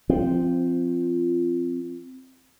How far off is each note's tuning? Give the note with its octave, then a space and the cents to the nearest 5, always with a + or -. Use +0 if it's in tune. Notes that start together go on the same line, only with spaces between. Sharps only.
F3 -15 C4 +0